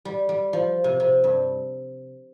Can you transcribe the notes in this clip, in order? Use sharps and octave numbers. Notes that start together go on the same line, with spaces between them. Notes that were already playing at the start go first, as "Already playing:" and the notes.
G3
G3
F3
C3
C3
G2